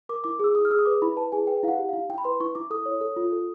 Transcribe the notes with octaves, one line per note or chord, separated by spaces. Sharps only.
A#4 D6
E4 D6
G#4 E6
G#4 D#6
F6
G#4 E6
D#6
B4 D6
E4 B5
B4 A5
G#4 G#5
B4 G5
E4 F5 F#5
G4
E4 F5
E4 G5
B5
B4 C6
E4 C#6
E4 D6
A4 D#6
C#5
A4
F4
A4